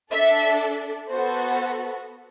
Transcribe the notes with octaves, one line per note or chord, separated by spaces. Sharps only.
D4 A4 E5
B3 F#4 A4 C5